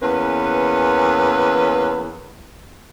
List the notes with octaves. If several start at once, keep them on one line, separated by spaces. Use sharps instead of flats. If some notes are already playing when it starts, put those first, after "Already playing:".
E2 A#3 C#4 B4